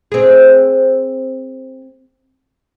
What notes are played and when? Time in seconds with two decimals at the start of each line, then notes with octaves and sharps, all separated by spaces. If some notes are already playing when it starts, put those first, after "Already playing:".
0.12 C4 G#4